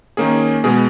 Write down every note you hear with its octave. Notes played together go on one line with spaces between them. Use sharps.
D#3 A#3 C#4 G#4
B2 G#3 B3 G#4